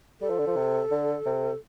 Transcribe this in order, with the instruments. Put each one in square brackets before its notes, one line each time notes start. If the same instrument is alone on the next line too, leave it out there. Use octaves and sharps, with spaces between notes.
[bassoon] G3 [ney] A4
[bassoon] F3
D3
F3
C3
D3
C3